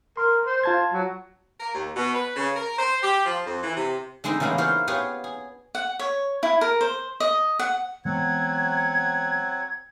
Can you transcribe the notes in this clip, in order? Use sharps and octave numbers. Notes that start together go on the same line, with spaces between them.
A#4 C6
C5
F4 A5 G#6
F#3
A#4
D#2
B2
B4
C#3
A#4
C5
G4
F3
F2
E3
C3
D3 G#3 C4 D#4
C#3 E3 G3 G#3 A#3 B3
E4 F4 A#4 C5 C#5
B3 F4 G4 G#4 B4 C#5
G#4
F#5
C#5
E4
A#4
C5
D#5
F#5
E3 F#3 G#3 B3 C4 F#5 G#6